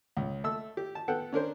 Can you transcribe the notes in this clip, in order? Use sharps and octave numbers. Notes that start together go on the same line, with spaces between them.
C#2
A3 E6
G4
A5
B3 A4 F#5 G5
C#4 D4 A#4 C5